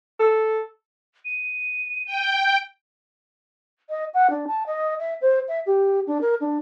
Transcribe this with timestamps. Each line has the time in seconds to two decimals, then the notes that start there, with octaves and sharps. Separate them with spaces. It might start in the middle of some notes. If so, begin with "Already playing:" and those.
0.20 A4
1.25 D#7
2.06 G5
3.89 D#5
4.14 F#5
4.30 D4
4.47 A5
4.66 D#5
4.99 E5
5.21 C5
5.48 E5
5.66 G4
6.07 D4
6.21 A#4
6.41 D4